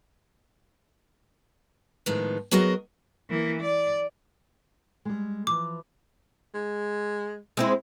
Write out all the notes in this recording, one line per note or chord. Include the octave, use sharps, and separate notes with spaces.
A2 D#3 F3 G#3 B3
F#3 B3 F#4 G#4 A#4 D#5
E3 A#3
D5
G3 G#3
E3 F3 D6
G#3
G#3 C4 E4